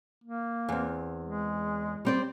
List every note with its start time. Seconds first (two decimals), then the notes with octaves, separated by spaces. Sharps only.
0.24 A#3
0.69 E2 C4
1.24 G#3
2.05 G3 C4 D5